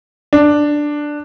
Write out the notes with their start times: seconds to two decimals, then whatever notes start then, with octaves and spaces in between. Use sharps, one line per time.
0.33 D4